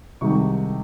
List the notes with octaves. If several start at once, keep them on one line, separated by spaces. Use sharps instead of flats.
C2 C3 D#3 G#3 D#4 C#6